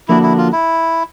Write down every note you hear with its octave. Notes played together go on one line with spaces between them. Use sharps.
D3 F3 A#3 D4 E4 F#4
E4
F4
E4